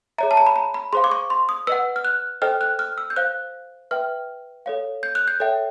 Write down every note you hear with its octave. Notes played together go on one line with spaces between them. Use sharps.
G#4 C#5 E5 A#5
A5
A#5
B5
A#5
B5
G#4 C5 F5 C6
D6
C#6
C6
D#6
B4 D#5 F#5 E6
F6
F#6
A4 C5 D#5 G5 F6
F#6
F6
E6
G6
C5 F5 F#6
B4 E5 G5 F6
A4 C#5 F5
G6
F#6
G6
A4 C#5 E5 G5